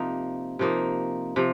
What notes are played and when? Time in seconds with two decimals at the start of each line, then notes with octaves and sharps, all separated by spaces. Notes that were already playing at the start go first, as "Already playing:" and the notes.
Already playing: C3 F3 A#3 D#4
0.59 C3 F3 A#3 D#4
1.36 C3 F3